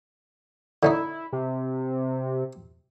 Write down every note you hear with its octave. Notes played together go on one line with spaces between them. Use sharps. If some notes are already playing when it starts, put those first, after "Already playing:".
D3 C#4 D#4 E4
C3